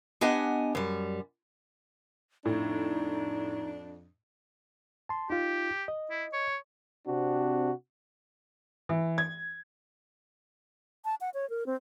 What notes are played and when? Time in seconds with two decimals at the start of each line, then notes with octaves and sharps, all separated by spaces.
0.21 B3 D4 G4 D#5 F#5 G#5
0.75 F#2 G3
2.45 F2 A2 D4 D#4
5.09 A5 C6
5.30 D#4 F4 G4
5.88 D#5
6.10 E4
6.33 C#5
7.06 C3 C4 D4 F#4
8.89 E3
9.18 G#6
11.05 A5
11.21 F#5
11.34 C#5
11.50 A#4
11.66 C4